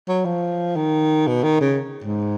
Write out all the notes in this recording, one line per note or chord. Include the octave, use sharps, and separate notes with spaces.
F#3
F3
D#3
B2
D#3
C#3
G#2